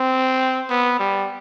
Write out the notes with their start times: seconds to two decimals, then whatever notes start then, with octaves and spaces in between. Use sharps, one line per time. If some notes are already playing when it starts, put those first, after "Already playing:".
Already playing: C4
0.70 B3
0.99 G3